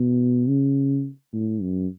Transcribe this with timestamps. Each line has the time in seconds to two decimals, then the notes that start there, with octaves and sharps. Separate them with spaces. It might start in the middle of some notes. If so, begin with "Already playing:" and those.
Already playing: B2
0.48 C#3
1.33 A2
1.62 F#2